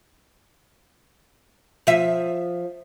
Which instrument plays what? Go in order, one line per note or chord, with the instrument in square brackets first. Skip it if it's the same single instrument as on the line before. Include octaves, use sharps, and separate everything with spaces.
[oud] F3 E5